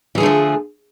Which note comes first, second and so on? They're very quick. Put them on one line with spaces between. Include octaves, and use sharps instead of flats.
E3 G#4 D3 A3 F3